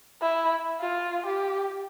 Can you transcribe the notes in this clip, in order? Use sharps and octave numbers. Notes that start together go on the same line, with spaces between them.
E4
F4
G4